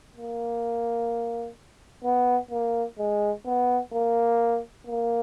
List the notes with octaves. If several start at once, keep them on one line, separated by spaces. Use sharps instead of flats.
A#3
B3
A#3
G#3
B3
A#3
A#3